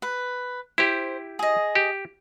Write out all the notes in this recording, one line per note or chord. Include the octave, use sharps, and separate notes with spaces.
B4
E4 G4 C5
G#4 D#5
G4